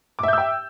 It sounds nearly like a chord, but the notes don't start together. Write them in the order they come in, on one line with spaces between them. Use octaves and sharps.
D6 E5 G6 E6 G5